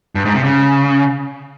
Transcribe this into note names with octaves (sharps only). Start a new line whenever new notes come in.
G2
G#2
C3
C#3